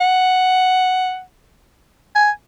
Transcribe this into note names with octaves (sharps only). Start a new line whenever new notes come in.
F#5
G#5